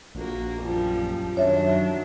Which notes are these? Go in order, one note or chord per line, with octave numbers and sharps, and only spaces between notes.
A#1 A#3 F#4
F#2 F3 G3
F#2 D#3 F#3 D4 C#5 E5